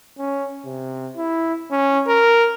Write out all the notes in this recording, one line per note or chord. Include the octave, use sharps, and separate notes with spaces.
C#4
C3
E4
C#4
A#4